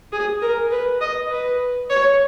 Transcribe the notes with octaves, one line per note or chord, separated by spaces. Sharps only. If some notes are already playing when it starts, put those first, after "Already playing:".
G#4
A#4
B4
D#5
B4
C#5